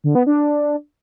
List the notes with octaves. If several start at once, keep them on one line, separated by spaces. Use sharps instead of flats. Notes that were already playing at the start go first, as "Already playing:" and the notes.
D3
B3
D4